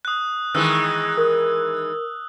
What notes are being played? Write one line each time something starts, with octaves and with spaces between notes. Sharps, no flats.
D#6 F#6
D#3 E3 G#3 E6 F#6
A#4